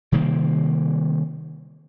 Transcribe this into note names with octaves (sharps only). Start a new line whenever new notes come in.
C3 D#3 G3 A#3